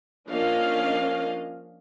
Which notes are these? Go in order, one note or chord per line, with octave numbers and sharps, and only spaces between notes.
F3 A#3 C#4 D4 D#5 F5